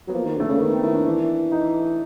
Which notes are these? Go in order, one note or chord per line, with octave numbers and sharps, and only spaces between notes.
F#3 B3
F3 A#3
D#3
D3 A3
C#3 A#3
D#3 B3
C4
D#3 E4
D4
E3
D#4